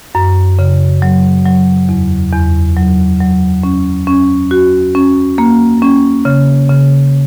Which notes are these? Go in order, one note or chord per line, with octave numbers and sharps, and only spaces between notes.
F#2
C#3
F#3
F#3
E2
E2
F#3
F#3
C#4
C#4
F#4
C#4
A#3
C#4
C#3
C#3